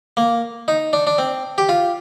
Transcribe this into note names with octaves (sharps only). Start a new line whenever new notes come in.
A#3
D#4
D4
D4
C4
G4
F4